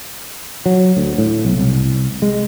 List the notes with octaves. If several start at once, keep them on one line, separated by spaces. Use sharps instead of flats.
F#3
D2
A2
B1
C2
G#3